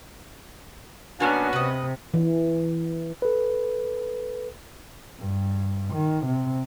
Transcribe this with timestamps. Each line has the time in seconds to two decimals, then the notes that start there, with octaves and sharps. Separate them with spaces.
1.20 B2 A#3 B3 C#4 D4 F#4 G#5
1.53 C3 B4 D#5
2.14 E3
3.22 A4 B4
5.19 G2
5.93 D#3
6.26 C3